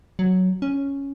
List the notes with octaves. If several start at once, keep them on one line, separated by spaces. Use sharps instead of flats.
F#3
C#4